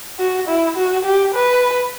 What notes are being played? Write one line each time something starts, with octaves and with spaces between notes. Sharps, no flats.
F#4
E4
F#4
G4
B4